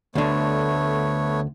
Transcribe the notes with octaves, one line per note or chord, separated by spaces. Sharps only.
D2 D3 A3 B3 C#5